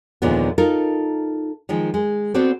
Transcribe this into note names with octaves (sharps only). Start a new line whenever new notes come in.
D#2 A#2 D3 F3 G#3 B3
D#4 F4 A4 A#4
D#3 F3 G#3
G#3
B3 C4 F#4 A4 C5 D5